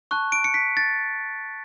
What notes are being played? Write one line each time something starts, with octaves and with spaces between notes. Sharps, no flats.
A5 C#6 F#6
D7
C#7
B6
A6